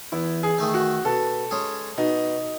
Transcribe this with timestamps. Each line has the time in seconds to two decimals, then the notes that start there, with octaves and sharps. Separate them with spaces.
0.12 E2 E4
0.43 G#4
0.58 D#3 A3 D#4
0.74 F#4
1.05 B2 A4
1.51 G#3 C#4 G#4
1.98 B2 D#4